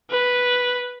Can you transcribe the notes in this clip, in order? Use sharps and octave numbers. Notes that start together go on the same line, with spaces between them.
B4